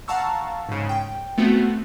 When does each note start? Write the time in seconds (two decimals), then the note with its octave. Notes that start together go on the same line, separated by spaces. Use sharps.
0.08 F5 F#5 A5 A#5 C#6 E6
0.69 G#2 C#3
0.89 G5
1.38 A3 B3 C4 F#4